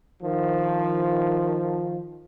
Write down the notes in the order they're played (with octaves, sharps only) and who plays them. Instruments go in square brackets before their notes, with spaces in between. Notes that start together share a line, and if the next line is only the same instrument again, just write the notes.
[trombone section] D#3 F3